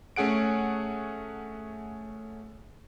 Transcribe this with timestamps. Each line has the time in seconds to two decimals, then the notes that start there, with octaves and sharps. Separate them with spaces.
0.16 A3 C#4 G#4 F#5 D7